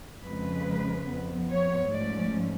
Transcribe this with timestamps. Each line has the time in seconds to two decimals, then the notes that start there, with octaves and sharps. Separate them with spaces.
0.24 F2 C#3 F3 G#3 B4
1.09 F2 F3 B3
1.50 C#5
1.92 G#2 F3 A3 C#4 D5